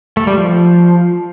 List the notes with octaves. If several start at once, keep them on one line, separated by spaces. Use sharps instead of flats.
A3
G3
F3